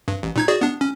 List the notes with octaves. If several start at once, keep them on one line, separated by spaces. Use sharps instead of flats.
G2
A1
A#2 D#4 G#6
F#4 G#4 D5
B3 D4
C#4